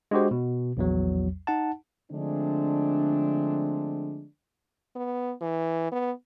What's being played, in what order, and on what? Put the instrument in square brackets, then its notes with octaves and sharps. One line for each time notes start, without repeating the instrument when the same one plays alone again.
[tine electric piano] G#3 D4 F#4 G4 C5
B2
A#1 E2 F#3
D#4 F#5 A5
[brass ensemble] D3 F3 G#3 A3 C4 D4
[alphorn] B3
E3
B3